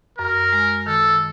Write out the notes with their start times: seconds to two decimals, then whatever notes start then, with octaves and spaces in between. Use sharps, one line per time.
0.18 F#2 A#4
0.52 G#3
0.87 D#3 A4